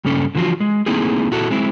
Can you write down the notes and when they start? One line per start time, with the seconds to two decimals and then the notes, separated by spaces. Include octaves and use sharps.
0.05 G2 C#3 A#3 C#4 A4
0.35 D3 E3 F3 F4 F#4
0.60 G#3
0.86 A3 A#3 C4 D#4 E4 G#4
1.31 A#2 E4 F#4 A4
1.50 G#3 C4 E4